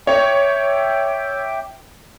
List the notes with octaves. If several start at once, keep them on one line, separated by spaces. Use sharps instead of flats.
C#5 E5 G5 D6